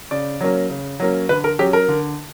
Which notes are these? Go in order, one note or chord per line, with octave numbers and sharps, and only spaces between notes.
C#3 D5
F#3 A#3 C#4
C#3
F#3 A#3 C#4
D3 B4
A#4
F#3 C#4 G4
A#4
D3